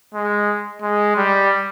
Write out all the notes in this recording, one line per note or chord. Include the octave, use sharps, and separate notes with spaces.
G#3
G#3
G3